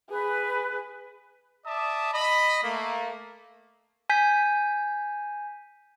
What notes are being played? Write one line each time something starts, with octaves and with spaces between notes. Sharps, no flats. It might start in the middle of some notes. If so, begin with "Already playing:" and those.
G#4 B4
D5 E5 A5 D#6
D#5 B5
A3 A#3
G#5 G6 B6